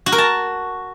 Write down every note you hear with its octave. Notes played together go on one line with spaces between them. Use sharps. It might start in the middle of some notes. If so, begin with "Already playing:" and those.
F#4
A#4
A5